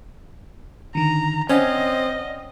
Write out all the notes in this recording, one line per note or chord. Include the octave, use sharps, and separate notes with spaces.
D3 D#3 A#5
C4 C#4 C5 D5 D#5 F#5